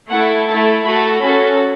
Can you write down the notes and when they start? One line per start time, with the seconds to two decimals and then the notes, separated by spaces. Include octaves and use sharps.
0.10 A3 E4 A4 F#5
0.46 A3 E4 A4 A5
0.85 A3 F#4 A4 B5
1.21 C#4 F#4 A4 B5